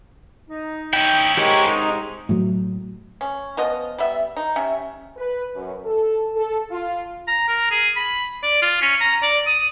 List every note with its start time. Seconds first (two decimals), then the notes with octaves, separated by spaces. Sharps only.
0.49 D#4
0.93 C#4 E4 G5
1.37 G#2 C3 G#3 G4 A#4 C#5
1.67 D#4
2.29 A2 F#3
3.21 C#4
3.57 F3 B3 D#5
3.98 G3 B3 E5
4.37 D#4
4.56 C3 C#4 E5
5.17 B4
5.54 F#2
5.85 A4
6.34 A4
6.70 F4
7.28 A#5
7.48 A#4
7.71 G#4
7.97 B5
8.43 D5
8.62 F4
8.82 C#4
9.01 A#5
9.23 D5
9.47 D#6